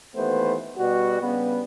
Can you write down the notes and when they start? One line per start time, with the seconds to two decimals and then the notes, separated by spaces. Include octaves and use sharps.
0.16 D#2 E3 A3 B3 B4 C5
0.77 B2 G3 F#4
1.21 G2 C#3 G3 B3